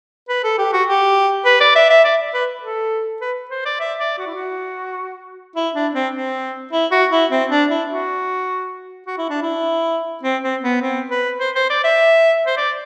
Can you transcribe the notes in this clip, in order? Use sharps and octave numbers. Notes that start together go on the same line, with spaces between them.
B4
A4
G4
F#4
G4
B4
D5
E5
E5
D5
B4
A4
B4
C5
D5
E5
D5
F#4
E4
F#4
E4
D4
C4
C4
E4
F#4
E4
C4
D4
E4
F#4
F#4
E4
D4
E4
C4
C4
B3
C4
B4
C5
C5
D5
E5
C5
D5